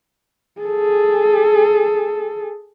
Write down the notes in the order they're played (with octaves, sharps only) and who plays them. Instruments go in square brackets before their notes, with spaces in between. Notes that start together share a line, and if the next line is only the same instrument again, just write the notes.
[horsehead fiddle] G#4 A4